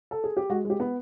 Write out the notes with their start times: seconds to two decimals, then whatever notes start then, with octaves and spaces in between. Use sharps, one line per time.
0.11 A4
0.24 G#4
0.37 G4
0.50 G#3 F#4
0.65 G#3 G4
0.80 B3